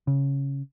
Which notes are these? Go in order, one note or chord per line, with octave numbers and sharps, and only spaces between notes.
C#3